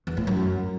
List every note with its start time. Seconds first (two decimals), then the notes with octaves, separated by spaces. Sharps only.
0.07 E2
0.17 A2
0.27 F#2